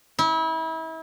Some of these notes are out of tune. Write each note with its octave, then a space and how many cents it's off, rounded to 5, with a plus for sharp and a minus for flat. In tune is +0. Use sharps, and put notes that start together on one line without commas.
E4 -35